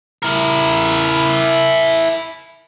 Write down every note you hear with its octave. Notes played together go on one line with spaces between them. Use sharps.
E4 A#4